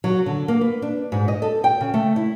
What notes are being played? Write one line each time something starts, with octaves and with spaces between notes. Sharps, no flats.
F#3
D3
A#3
B4
D4
G#2
D#5
A4
G5
C#3
A3
E4